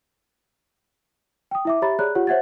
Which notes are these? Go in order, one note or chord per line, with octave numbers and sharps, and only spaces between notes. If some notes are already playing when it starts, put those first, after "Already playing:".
G5 D#6
E4 E5 D6
G4 C#5 E5 A#5 B5 A6
G#4 C#5 D5 A#5 B5 F#6
F4 G4 C#5 F#5
C5 C#5 E5 F#5 G#6 A6